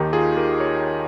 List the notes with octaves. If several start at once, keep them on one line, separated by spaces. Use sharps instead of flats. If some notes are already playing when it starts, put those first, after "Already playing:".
Already playing: D#2 D#3 D#4 G4
F4 G#4
G4 A#4
C#5